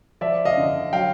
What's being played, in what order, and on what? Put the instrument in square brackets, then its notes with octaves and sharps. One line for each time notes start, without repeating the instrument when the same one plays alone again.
[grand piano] F3 D5 E5
D#5 F5
D3
F#3 F5 G5